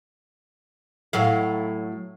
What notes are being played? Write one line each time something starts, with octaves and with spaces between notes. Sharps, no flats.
A2 F#3 F5